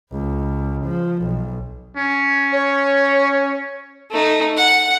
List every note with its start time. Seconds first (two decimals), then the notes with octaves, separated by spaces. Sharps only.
0.12 C#2
0.85 F3
1.23 B1
1.97 C#4
2.52 C#5
4.11 A3 D#4
4.57 F#5